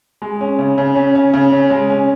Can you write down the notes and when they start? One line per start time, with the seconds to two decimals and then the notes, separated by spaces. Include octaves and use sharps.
0.22 G#3
0.41 C#4
0.59 C#3
0.78 C#3
0.96 C#4
1.15 C#4
1.34 C#3
1.52 C#4
1.70 G#3
1.90 C#4